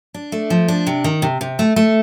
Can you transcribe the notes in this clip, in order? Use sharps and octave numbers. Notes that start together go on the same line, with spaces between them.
D4
A3
F3
D4
C3
D#3
C3
C3
A3
A3